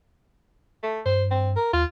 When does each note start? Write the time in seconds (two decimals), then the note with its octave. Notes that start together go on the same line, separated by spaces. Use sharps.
0.83 A3
1.06 G2 C5
1.31 C4
1.56 A#4
1.73 D#2 F4